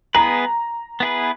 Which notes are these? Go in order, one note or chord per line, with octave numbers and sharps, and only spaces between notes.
B3 E4 G#4 B4 A#5
B3 E4 G#4 B4